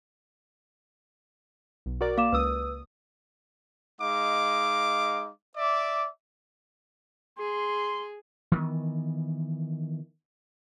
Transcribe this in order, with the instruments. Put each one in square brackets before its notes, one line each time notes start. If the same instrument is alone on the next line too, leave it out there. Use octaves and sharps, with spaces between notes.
[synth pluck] B1
F#4 A#4 D5
[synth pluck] A#3 [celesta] F5 D6 E7
[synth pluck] C#2 D#6 [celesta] B4 E6
[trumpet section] G#3 D#4 F5 D6
D5 E5 D6
[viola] G#4 [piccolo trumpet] C6
[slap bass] D#3 E3 B3